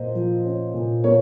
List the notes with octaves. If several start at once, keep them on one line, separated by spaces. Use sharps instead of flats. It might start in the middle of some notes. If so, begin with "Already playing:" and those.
Already playing: A#2 A#3 C5 D#5
F3
C#4
A#2
A#3 C#5